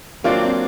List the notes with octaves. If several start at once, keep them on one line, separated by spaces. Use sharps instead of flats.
F#3 A#3 C4 D4 F4